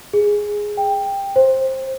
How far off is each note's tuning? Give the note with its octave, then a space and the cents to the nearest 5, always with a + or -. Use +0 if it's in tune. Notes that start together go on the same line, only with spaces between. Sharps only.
G#4 -5
G5 +10
C5 +15